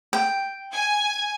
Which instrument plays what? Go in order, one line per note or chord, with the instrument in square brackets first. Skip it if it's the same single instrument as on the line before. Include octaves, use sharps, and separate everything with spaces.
[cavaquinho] G5
[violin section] G#5